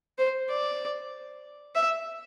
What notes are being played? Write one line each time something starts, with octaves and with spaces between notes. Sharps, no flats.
C5
D5
E5